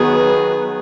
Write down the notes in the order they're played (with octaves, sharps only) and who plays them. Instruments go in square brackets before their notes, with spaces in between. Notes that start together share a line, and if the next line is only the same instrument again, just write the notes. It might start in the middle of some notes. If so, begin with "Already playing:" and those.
Already playing: [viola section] D#3 F#3 B3 F#4 B4 [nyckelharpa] G#4